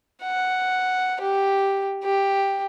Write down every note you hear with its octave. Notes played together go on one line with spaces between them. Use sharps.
F#5
G4
G4